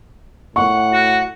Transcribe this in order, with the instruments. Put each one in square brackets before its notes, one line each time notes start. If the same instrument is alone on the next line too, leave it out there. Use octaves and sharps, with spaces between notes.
[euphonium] A2 [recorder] F#5 [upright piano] C#6
[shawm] F#4